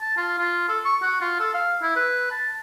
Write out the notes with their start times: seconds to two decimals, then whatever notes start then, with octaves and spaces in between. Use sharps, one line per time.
0.01 A5
0.17 F4
0.38 F4
0.69 A4
0.85 C#6
1.02 F#4
1.21 F4
1.39 A4
1.54 F5
1.82 E4
1.96 B4
2.31 A5